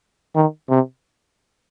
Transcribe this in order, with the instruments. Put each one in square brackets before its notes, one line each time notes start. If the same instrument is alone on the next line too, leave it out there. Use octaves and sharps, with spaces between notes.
[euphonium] D#3
C3